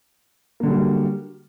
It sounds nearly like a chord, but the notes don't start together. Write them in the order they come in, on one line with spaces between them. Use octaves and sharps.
A#3 D3 F#3 G3